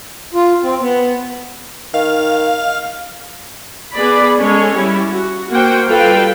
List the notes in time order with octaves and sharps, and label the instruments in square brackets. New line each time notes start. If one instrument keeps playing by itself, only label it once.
[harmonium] F4
C4
B3
[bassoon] D#3 [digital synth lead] F5
[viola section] B3 G#4 D5 B5
G#3 C#4 A4 C#5
G3 C#4 E4
F#4
A#3 F#4 C5 F#5 G5
G3 F4 A4 B4 F5 G5